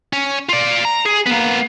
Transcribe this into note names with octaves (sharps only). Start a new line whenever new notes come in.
C#4
F4 D5
A#5
G#4
A#3 B3